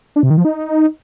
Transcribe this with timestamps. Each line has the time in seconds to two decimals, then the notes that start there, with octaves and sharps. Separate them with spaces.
0.16 D4
0.23 C3
0.30 D#3
0.37 F3
0.45 D#4